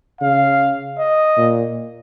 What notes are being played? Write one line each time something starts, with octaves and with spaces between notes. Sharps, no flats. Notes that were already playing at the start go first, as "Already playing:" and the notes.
C#3 F5
D#5
A#2